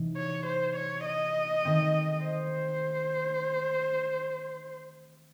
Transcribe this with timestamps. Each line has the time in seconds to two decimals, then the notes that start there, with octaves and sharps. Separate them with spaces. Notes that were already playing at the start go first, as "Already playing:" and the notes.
Already playing: C3 E3 D#4
0.16 C#5
0.46 C5
0.76 C#5
1.05 D#5
1.65 D#3 A3 C4
2.24 C5